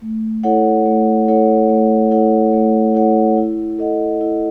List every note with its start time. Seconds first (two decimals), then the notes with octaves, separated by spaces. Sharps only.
0.02 A3
0.43 E4 A4 C#5 F#5
0.86 A3
1.28 E4 A4 C#5 F#5
1.69 A3
2.11 E4 A4 C#5 F#5
2.53 A3
2.95 E4 A4 C#5 F#5
3.37 E4
3.78 A4 D#5 F#5
4.21 E4